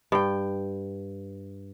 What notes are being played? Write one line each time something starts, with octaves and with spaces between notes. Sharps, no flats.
G2 G5